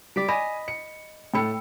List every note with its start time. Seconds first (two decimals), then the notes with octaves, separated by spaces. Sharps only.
0.16 G3 D5 B6 D7
0.28 D#5 G#5 B5
0.68 C#7
1.34 A2 A4 G5 B5 E6 C#7